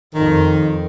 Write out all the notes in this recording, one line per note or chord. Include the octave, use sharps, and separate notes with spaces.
F2 D#3